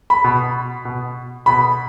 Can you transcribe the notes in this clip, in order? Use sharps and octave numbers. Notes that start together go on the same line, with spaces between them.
B5
B2
B2
B2 B5